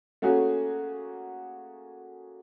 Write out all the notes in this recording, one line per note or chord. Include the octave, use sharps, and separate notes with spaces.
A3 A#3 C#4 F#4 G#4